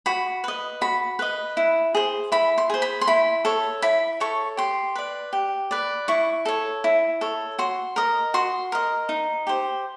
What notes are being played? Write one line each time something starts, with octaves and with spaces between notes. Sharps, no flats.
F#4 B5
B4 D#5
F#4 B5
B4 D#5
E4
G#4 C5
E4 B5
C6
G#4 C5
B5
C6
E4 B5
A4 C#5
E4 B5
A4 C#5 C#6
G4 C6
B4 D5
G4
B4 D5
E4 C#6
A4 C#5
E4
A4 C#5
F#4 C6
A#4 D#5
F#4 C6
A#4 D#5
D#4
G4 C5